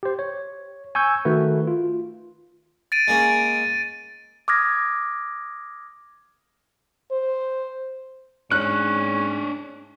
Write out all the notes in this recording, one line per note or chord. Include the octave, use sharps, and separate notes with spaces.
G4 C5
C#5
G#5 C#6 E6 G6
D#3 A3 F#4 B4
F4
A6 D7 D#7
G#3 A#3 C#4
D6 D#6 F6 G#6 A#6
C5
G#2 C#4 D4 C#5 F#6